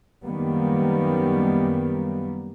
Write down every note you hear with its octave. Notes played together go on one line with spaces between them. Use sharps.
F#2 D#3 G3 A#3 B3